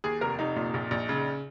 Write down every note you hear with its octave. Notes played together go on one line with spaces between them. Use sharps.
D#2 G#4
F1 A#4
F1 D#4
A#2
A#1
A#1
C#3